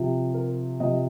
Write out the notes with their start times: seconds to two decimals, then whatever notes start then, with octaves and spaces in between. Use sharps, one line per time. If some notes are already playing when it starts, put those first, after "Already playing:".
Already playing: C3 F3
0.34 A#4
0.80 C3 F3 D#5